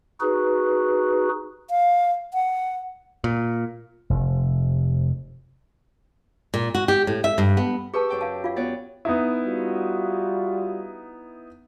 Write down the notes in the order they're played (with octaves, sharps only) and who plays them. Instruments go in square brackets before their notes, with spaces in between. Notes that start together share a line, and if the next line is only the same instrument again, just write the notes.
[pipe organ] D#4 F#4 G#4 B4
[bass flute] F5
F#5
[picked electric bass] A#2
[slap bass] F1
[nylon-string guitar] A#2
F#4
G4
A2
E5
G2
B3
[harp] G4 C#6 E6 [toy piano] G#4 B4 A5
[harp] F#2 G5 D6
[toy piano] F5 A5
F4 F5
[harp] B3 C#5 D5
[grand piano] B3 D#4 E4
[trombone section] G3 F4 F#4